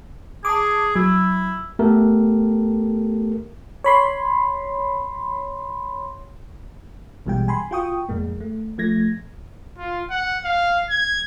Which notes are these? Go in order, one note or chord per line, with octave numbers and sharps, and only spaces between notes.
G#4 A5 D6
F#3 E4
A3 B3 G4 A4 A#4
C#5 B5 C6
A#1 B2 E3 G3 G#3 G5
G#5 B5 C6
F4 F#4 G5 C#6 D#6
F2 A2 G#3 A#3
A3
F3 A3 G#6 A#6
F4
F#5
F5
G#6